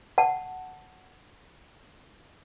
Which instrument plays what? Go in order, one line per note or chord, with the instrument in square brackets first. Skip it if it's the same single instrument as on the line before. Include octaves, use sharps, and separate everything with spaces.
[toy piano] F#5 A5